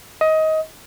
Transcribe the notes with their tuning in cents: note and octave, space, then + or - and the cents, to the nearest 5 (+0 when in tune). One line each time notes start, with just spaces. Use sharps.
D#5 +20